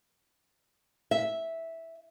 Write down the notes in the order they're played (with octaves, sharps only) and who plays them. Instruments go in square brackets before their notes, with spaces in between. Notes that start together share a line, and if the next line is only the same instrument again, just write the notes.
[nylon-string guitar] E5